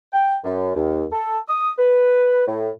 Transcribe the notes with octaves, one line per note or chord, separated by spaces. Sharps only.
G5
F#2
D#2
A4
D#6
B4
A2